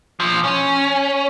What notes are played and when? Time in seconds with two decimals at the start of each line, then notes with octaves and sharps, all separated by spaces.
0.20 A#2 F3
0.44 C#4